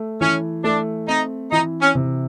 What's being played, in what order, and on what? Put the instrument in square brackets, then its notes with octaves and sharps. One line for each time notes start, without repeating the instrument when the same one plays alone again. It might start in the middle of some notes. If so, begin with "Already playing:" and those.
Already playing: [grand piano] A3
[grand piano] E3 [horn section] C#4
[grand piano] A3 [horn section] D4
[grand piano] C4 [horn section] D#4
[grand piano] E3 [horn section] D#4
[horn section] C#4
[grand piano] C3